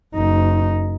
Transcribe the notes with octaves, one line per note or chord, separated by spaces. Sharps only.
F#1 D#4